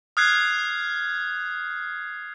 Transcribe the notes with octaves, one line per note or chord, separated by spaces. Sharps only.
D#6 F6 F#6 G#6 C7